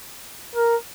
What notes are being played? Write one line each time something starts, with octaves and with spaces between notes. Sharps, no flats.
A#4